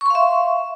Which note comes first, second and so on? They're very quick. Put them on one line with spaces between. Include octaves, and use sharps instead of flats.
C#6 C6 F5 E5